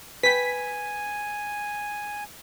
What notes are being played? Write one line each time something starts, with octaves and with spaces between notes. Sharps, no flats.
B4 G5 G#5 B6